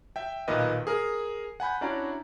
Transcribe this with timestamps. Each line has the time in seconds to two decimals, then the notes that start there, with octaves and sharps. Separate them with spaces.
0.16 E5 G5
0.48 B1 A#2 D#3 B4 D#5
0.87 G#4 A#4
1.60 F#5 G#5 B5 G6
1.81 C#4 D4 E4 F#4 D5 A#5